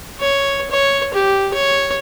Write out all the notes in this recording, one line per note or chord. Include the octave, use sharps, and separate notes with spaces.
C#5
C#5
G4
C#5